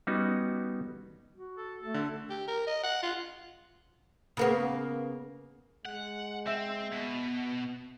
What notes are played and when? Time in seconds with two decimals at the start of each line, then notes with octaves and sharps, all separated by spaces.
0.07 G3 B3 C#4 D#4 F#4
1.36 F#4
1.57 A4
1.81 A3 A4
1.94 D3
2.30 G4
2.48 A#4
2.67 D#5
2.83 F#5
3.03 F4
4.37 C#3 A#3 B3
5.85 G#3 F#5
6.47 C4 E5
6.92 B2